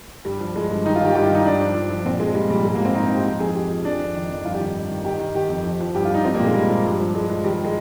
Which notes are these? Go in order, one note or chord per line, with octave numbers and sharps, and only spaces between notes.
G2 G3
F3
F3 G#3
G2
D#3 D#4
F4
D#3 G4
G2 G4
F4
D#3 D#4
G2 D4
F3
F3
F3
A#2 C4
F3 G#3
F3 G3
A#2 G3
G#2 G#3
A#3
F3
C4
F3 D#4
D#4
F3 G4
F3 G4
F2 G#4
F3 G4
F3
F2 D4
F2
D#3
F2
G2 F4
G4
D#3
G2
D#3
D#3 G4
D#3
D#3 G4
F2
F3
F3
G2 G4
F4
G2 D#4
F3 C4
A#3
A#2 G#3
A#2 G3
F3
G2
F3
F3 G#3
F3
D#3 G3
D#3
G#3